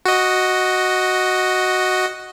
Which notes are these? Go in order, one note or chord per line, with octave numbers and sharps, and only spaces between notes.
F#4 D#5